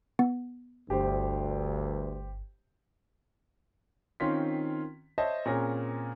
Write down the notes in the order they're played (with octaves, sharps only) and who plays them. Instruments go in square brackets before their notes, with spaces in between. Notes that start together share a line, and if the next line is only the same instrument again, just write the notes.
[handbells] B3
[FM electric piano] G1 [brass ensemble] D2 G2 [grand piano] G4 C5
[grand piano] D#3 C4 C#4 F4 C6 B6
C5 C#5 D#5 E5 A5
A#2 C4 C#4 G#4 A#4 A#6